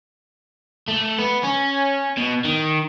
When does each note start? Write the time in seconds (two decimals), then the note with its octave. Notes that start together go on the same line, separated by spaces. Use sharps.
0.89 A3
1.19 B3
1.43 C#4
2.18 B2
2.45 D#3